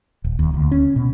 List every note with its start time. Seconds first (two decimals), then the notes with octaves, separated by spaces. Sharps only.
0.24 D#1
0.39 D#2
0.54 D2
0.71 C#4
0.96 B2